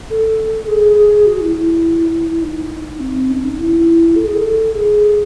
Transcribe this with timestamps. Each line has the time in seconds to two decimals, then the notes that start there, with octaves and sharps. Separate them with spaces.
0.10 A4
0.68 G#4
1.26 F#4
1.41 E4
1.55 E4
2.42 D#4
3.00 C4
3.29 C#4
3.44 D#4
3.59 E4
4.16 A4
4.27 G#4
4.36 A4
4.74 G#4